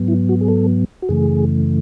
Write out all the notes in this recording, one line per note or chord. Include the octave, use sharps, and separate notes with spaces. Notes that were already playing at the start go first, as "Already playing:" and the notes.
Already playing: G#2 F#3 B3
E4
F#4
G#4
A4
F#4
F#2 C#3 E3 A3 G#4